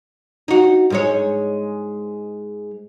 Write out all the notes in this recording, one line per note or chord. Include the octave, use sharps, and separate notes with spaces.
D#4 F#4
G#2 G#3 C#5